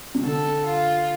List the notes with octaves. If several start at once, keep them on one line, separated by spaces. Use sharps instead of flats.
C3
D3 A4
F4